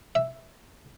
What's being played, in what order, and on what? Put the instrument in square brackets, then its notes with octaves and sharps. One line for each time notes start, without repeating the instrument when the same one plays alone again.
[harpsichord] E5